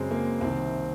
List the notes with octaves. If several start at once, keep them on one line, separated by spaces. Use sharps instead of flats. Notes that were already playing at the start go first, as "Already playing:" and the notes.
Already playing: F#2 C#3 G#3 C4
A#3
C2 C3 D#3 C4